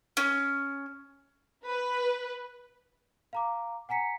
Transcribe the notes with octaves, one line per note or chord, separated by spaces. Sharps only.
C#4
B4
F5 A#5 D6
F#5 G#5 A#5 B6 C#7